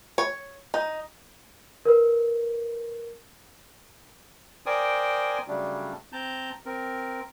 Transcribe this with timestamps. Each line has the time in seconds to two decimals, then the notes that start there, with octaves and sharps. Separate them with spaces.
0.18 C#5
0.74 D#4
1.85 A#4 B4
4.66 A#4 C5 D5 G5 G#5 D#6
5.48 C#3 F#3 G3 A3 D4
6.13 C4 A5 A#5 G6
6.66 C4 A#4